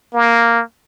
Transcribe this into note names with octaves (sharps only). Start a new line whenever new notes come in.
A#3